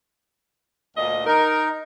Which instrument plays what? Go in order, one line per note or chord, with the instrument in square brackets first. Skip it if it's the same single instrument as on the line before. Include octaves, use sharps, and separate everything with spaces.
[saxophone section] D2 A#2 D#5
[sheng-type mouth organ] D#4 [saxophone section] A#4